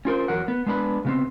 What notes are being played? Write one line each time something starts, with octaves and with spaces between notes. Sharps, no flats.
C#4 F4 A#4 C5
E2 F#3 A#4 F#5
B3
G#3 B3 D4 B4
C#3 B3 C4